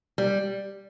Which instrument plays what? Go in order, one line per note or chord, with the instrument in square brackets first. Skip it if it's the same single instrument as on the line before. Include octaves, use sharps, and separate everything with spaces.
[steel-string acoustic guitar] G3